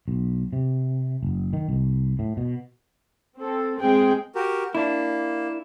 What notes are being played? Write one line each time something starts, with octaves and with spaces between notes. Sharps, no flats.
B1
C3
F#1
D#3
C2
A2
B2
C4 A4
G#3 C4 G#4 G5
F#4 G4 A#4
A#3 D4 E4